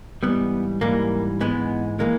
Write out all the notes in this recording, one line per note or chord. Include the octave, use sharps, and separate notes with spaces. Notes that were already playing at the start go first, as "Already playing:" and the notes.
G#2 E3 G3 B3
G#2 E3 G3 A#3
G#2 E3 G#3 B3
E3 G#3 A#3